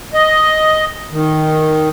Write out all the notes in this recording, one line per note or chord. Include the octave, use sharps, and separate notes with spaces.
D#5
D#3